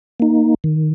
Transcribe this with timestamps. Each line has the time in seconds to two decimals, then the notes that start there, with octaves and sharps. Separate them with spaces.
0.20 A#3 D#4
0.64 D#3